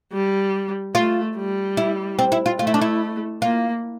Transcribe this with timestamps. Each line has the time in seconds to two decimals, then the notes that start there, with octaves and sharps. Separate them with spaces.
0.12 G3
0.95 A3 F4
1.36 G3
1.77 E4
2.19 C4
2.32 E4
2.46 F4
2.59 A3 F4
2.67 E4
2.74 D4
2.81 E4
3.42 A#3 F4